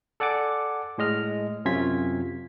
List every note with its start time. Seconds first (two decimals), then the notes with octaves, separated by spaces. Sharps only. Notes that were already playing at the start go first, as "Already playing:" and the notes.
0.20 A4 D5 F#5 G#5 D6
0.98 A2 G#3 D#5 F6
1.65 F#2 C3 C#4 F4 G#6 B6